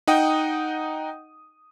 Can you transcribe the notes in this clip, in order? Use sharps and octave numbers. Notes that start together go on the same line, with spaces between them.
D#4 D#5 F#5 G5 D#6